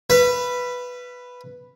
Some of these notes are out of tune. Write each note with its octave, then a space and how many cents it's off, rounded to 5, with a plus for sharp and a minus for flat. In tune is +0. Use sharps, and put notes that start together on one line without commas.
B4 +0 F5 -45